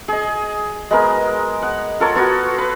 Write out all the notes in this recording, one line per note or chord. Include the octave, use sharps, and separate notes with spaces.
G#4 D#5
G#3 B3 A#4
F#5
F4 A4 A#4 C#5
B3 F4 F#4
B4